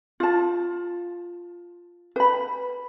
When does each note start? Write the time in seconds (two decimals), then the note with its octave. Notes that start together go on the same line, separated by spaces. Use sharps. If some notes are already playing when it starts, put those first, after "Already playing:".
0.20 F4 A5
2.16 B4 B5